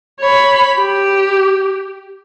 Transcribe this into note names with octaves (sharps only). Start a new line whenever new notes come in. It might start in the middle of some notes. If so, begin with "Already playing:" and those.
C#5 B5
G4